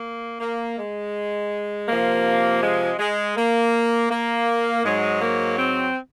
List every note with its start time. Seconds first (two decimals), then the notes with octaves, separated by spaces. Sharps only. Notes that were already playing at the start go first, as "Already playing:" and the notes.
Already playing: A#3
0.40 A#3
0.78 G#3
1.88 C3 F3 A#3
2.62 G#3
2.99 G#3
3.37 A#3
4.10 A#3
4.84 G#2 F#3 G#3
5.21 A#3
5.58 C4